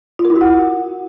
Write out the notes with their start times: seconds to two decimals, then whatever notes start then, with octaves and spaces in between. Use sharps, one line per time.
0.19 F4
0.25 A#4
0.30 E4
0.36 F#4
0.41 F#5